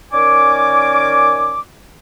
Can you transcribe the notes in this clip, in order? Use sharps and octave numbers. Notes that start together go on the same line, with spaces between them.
D#3 C#4 A#4 D5 G#5 D6